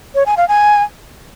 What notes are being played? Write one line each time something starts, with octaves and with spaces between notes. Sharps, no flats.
C#5
G#5
F5
G#5